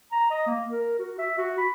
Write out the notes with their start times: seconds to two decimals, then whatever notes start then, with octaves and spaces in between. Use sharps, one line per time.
0.12 A#5
0.31 D#5
0.47 A#3
0.71 A#4
0.99 F#4
1.19 E5
1.38 F#4
1.58 B5